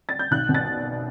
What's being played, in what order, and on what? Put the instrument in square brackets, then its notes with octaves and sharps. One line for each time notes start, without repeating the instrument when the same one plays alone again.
[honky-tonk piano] A6
G6
B1 F#6
B2
A6